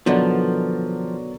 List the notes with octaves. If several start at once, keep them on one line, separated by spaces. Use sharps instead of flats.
B2 D3 D#3 F3 F#3 B3 D5